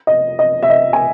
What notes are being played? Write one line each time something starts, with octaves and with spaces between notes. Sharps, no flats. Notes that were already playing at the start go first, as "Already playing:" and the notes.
D#5
D#5
E5
D#5
G#5